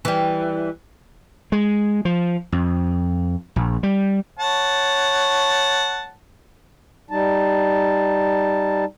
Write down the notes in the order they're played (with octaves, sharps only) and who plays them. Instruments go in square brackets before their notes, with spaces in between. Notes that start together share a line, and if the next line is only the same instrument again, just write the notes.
[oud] E3 G3
[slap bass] G#3
F3
F2
A#1
G3
[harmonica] C#5 F#5 A5
[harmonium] G3 D#4 A5